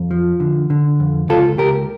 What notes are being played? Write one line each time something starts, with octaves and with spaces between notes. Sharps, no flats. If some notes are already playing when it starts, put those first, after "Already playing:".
Already playing: F2
F3
D3
D3
F2
C#2 F4 A4
C#2 G4 A#4